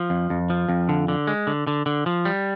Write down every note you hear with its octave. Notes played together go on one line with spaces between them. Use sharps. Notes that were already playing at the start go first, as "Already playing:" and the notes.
Already playing: F3
F2
F2
F3
F2
D3
D3
G#3
D3
D3
D3
F3
G3